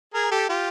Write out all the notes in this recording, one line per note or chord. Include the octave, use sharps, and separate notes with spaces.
G#4 A#4
G4 A4
F4 G4